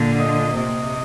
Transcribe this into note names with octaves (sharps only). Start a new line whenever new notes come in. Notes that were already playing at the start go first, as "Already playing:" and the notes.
Already playing: A#2 D3
D#5
C3 D#5